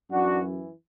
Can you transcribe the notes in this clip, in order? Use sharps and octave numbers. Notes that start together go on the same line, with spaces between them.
F#2 E3 D4 F#4